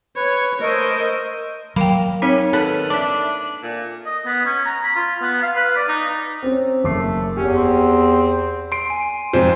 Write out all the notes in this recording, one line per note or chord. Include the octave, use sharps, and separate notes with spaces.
B4 C#5
A3 A#4 C5 D#5
F#3 A#3 G5 B5
C4 C#4 D#4 C#5
D#3 A4 B4 F#5
D4 D5 E5
A#2
D#5
B3
C#4
A#5
B5
F4
B3
F5
B4
D5
D#4
C4 C#4
F#1 A3 D6 C7
E2 C#4 G4
C4
C6 D7
G#5
F2 G#2 C5